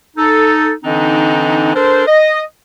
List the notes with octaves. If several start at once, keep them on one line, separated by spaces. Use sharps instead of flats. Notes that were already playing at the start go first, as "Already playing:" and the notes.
D#4 A4
D3 E3 C4 D4 D#4
D4 A4 A#4 C5
D#5